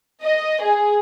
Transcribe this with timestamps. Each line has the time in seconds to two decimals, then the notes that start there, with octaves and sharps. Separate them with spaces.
0.24 D#5
0.62 G#4